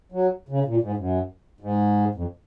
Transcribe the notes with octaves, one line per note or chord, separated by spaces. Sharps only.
F#3
C#3
A#2
G#2
F#2
G#2
F2